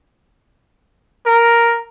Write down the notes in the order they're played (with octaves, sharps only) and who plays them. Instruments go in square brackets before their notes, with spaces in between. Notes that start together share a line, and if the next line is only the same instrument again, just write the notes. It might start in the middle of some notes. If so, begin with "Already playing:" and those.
[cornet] A#4